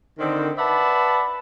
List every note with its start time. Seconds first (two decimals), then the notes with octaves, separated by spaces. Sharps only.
0.19 D3 D#3 C4
0.58 B4 D5 E5 F#5 A5 B5